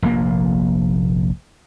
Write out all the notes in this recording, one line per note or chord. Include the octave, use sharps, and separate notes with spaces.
F1 A#1 A#2 A#3